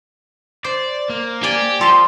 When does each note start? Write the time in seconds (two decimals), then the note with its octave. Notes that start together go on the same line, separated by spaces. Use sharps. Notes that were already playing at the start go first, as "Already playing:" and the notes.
0.64 C5 D5
1.09 A#3
1.44 G4 D5 G#5
1.81 F3 A4 F5 C6